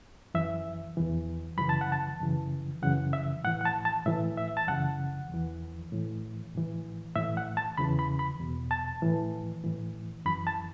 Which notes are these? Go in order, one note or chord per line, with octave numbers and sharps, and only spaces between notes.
F#2 E3 E5
E2 E3
F#2 C#3 E3 B5
A5
F#5
A5
F#2 C#3 E3
F#2 C#3 E3 F#5
E5
A2 E3 F#5
F#5
A5
A5
A2 E3 E5
E5
A5
F#2 C#3 E3 F#5
E2 E3
A2 E3
A2 E3
A2 E3 E5
F#5
A5
E2 C#3 E3 B5
B5
B5
E2 B2
A5
A2 E3
A2 E3
F#2 E3 B5
A5